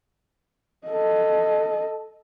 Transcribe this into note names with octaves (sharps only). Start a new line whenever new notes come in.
A4 D#5